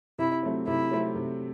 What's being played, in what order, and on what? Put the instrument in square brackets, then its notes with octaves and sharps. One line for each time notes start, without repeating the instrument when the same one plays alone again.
[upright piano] C3 [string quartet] E4
[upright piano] F#3 A3 C4
[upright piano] C3 [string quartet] E4
[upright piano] F#3 A3 C4
C3